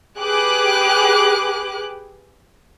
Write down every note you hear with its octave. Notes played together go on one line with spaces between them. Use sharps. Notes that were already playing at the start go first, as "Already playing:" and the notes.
G4 G#4 B4 D6 F#6